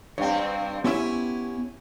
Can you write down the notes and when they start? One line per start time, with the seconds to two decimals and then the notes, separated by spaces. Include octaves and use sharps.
0.18 G2 C4 C#5 G5
0.84 B3 C#4 E4 G4 E5